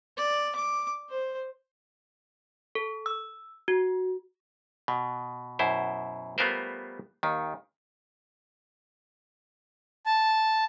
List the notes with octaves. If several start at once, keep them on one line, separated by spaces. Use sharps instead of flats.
D5
D6
C5
A4
E6
F#4
B2
F#2 B2 E4 C5
G3 A3 B3 F4 A#4 C5
D#2 D#3
A5